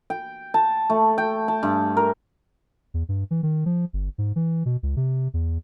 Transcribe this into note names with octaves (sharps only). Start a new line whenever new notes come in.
G5
A5
A3
G5
A5
G2
A#4
E2
G2
E3
D#3
F3
G1
G#2
E3
B2
C#2
C3
E2